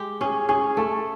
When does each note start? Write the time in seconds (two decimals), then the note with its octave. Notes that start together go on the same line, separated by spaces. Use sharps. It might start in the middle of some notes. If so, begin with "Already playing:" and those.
Already playing: G#3 G4
0.21 C#4 G#4
0.49 C#4 G#4
0.77 A3 A4